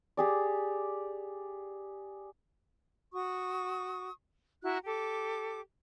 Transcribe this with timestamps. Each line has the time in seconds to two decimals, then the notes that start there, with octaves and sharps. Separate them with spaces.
0.17 G4 G#4 D5
3.13 F#4 C#6 D#6
4.63 E4 F#4 A#5 F#6
4.85 G4 A4 D6